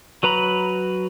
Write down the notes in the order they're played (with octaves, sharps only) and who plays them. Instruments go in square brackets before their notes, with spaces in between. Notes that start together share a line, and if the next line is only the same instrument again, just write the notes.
[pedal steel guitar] F#3 B4 A#5 B5